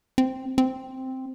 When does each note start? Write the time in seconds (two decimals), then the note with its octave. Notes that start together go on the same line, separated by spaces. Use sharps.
0.18 C4
0.58 C4